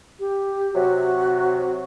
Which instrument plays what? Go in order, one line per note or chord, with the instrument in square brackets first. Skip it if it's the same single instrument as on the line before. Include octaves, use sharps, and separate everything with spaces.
[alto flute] G4
[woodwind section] C3 F#3 [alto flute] F#4